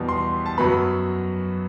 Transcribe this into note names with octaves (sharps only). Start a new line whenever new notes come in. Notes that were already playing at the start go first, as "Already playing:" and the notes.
Already playing: E2 B2 G3 B3
C6
A5
F#2 F#3 B3 B5